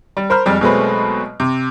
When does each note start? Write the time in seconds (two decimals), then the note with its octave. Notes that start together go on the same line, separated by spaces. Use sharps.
0.17 G3
0.30 A#4 C5 B5 F6
0.46 F2 G3 G#3
0.61 B2 F#3 G#3 A3 C4 B4
1.40 C3